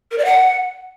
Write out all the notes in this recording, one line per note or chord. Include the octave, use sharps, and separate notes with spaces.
A#4
D5
F#5